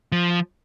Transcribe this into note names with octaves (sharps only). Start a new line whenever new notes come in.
F3